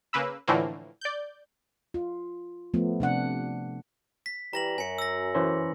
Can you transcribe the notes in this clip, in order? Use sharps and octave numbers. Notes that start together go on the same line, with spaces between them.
C#3 A#3 B4 E6
A2 D3 E3 F3 A3 A#3
D5 G6
F4
F3 A3 B3
C3 D4 F#5
B6
E3 G3 A#5 A#6 F#7
F#2 G#5 C#7
E6 A#6
E3 C#4 C5